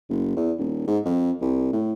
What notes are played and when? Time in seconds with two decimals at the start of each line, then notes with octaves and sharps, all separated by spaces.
0.09 F#1
0.36 E2
0.58 D#1
0.87 G#2
1.05 F2
1.41 C2
1.73 A2